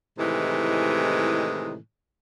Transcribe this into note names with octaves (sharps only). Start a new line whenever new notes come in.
A2 C3 D#3 E3 G#3